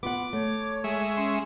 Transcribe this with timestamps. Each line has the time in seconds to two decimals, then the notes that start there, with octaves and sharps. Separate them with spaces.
0.03 B3 F4 F#5 D6
0.33 A3 C#5
0.84 G#3 E5 C#6
1.17 C#4 C6